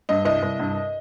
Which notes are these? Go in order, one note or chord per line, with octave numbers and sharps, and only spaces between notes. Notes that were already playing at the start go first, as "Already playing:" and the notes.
G2 D#5
C2 D#5
C2
G2